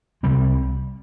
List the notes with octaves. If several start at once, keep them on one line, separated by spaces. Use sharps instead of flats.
C2 C3 G3 C4